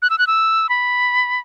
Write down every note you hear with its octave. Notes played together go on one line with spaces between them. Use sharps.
F#6
E6
F#6
E6
B5